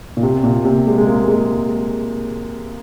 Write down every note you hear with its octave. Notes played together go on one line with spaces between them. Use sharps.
A#2
C3
A#2
C3
G#3
G#3
A#3
G#3